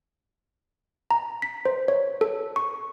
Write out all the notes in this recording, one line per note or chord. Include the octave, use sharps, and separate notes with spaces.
A#5
B6
C5
C#5
A4
C#6